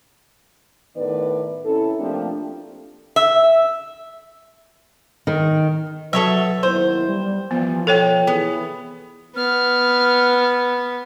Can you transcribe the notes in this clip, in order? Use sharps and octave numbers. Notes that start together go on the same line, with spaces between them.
A2 D#3 B3 B4 D5
C3 C#4 E4 A4
F3 A3 A#3 C4 D4 G4
E5
D#3
F#3 F#4 A4 B4 C#5 E5
D#2 B3 E4 C5
G3
E3 F3 B3
B2 F3 A4 C#5 G5
E3 B3 G#4
B3 F6